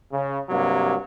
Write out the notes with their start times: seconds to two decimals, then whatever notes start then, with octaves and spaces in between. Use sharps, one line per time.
0.12 C#3
0.48 G2 C3 F#3 A#3